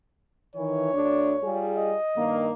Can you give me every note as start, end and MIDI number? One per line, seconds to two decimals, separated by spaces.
0.55 0.93 51
0.55 0.93 52
0.55 1.67 73
0.93 1.34 38
0.93 1.34 62
1.43 1.96 55
1.43 1.96 65
1.43 1.96 68
1.77 2.50 75
2.16 2.52 43
2.16 2.52 51
2.16 2.52 58